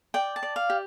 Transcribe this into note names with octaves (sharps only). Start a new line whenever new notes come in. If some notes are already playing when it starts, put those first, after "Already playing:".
D5 G5
A5
D5
F5
G4